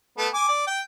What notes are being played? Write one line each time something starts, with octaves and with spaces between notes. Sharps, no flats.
A3 B3 A5
G#5 D6
D5
G5